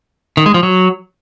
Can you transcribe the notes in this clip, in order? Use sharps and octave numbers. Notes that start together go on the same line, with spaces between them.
D#3
G#3
F3
F#3